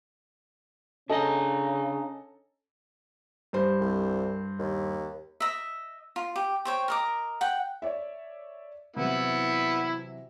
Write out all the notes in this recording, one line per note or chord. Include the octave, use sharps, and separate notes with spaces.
C#3 C#4 D4 A4 D#5 G#5 A#5
G2 C5
C2
D#2
D#5 E5
F4
G4
C5 C#5 G5
A#4 D#5 D6
F#5 G5
C#5 D5 E5
C3 E3 F#3 B3 E4